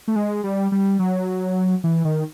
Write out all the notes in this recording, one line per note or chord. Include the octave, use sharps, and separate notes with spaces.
A3
G#3
G3
G3
F#3
E3
D#3